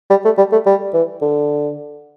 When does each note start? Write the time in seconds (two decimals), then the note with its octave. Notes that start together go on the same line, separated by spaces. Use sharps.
0.10 G3
0.25 A3
0.38 G3
0.52 A3
0.66 G3
0.94 E3
1.22 D3